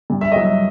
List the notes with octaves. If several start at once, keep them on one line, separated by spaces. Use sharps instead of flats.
G2
E5
F#3 D#5
E5